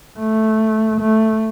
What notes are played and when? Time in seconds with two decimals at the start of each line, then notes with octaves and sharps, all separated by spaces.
0.19 A3
1.01 A3